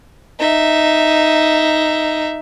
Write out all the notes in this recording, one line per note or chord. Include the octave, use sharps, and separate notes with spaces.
D#4 E5